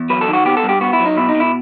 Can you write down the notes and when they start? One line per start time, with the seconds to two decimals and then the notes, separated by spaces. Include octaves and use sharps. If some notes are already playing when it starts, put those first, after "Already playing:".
Already playing: E2
0.10 F#3 B4
0.21 A4
0.28 D#3
0.33 F#4
0.45 B3 G4
0.57 A4
0.63 G2
0.69 G4
0.81 B3 F#4
0.93 E4
0.99 F#3
1.05 D#4
1.17 B2 E4
1.29 D#4
1.35 B2
1.40 E4